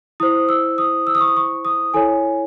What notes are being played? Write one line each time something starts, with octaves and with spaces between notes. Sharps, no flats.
E4 C5 D#6
E6
D#6
E6
D#6
C#6
D#6
C#6
D#6
E4 A4 C#5 G#5